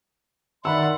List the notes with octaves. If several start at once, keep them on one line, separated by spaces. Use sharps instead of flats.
D#3 D5 E5 F#5 B5 C6 E6